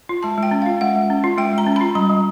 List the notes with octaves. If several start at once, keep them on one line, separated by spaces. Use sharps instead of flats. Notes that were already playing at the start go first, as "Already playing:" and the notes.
F4
G#3 A5
G#3
G5
C#4
F4 F5
G#3 F#5
G#3
C#4
F4
G#3 G5
G#3
A#5
C#4
F4 B5
G3 A#5
G3